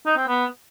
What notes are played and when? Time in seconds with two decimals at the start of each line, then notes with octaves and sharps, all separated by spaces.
0.06 D#4
0.17 C4
0.27 B3